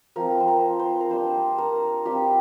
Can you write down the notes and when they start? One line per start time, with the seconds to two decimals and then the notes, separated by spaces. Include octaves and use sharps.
0.16 F3 C4 F4 A#4
0.40 C5
0.48 A#4
0.79 C5
1.01 A#4
1.11 G3 D4 F4 C5
1.58 A#4
2.05 G3 C4 F4 G4